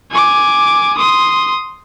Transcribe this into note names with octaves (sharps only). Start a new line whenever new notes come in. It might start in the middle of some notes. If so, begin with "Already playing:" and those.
G#5 D6
C6 D#6